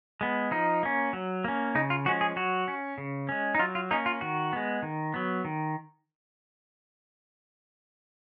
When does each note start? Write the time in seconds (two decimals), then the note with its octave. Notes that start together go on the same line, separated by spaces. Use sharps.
0.21 G#3 B3
0.51 F3 D#4
0.83 A#3 C#4
1.13 F#3
1.44 A#3 C#4
1.75 C#3 D#4
1.90 F4
2.05 F3 G#3 C#4 F#4
2.21 G#4
2.36 F#3 F#4
2.68 C#4
2.98 C#3
3.29 G#3 C#4
3.55 D#4
3.59 F#3 F4
3.75 F4
3.91 A#3 C#4 D#4
4.06 F4
4.21 D#3 F#4
4.53 G#3 B3
4.82 D#3
5.14 F#3 B3
5.45 D#3